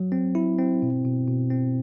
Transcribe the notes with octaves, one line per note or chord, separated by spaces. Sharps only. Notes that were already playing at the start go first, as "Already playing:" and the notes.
Already playing: F#3
C4
E4
C4
B2
B2
B2
C4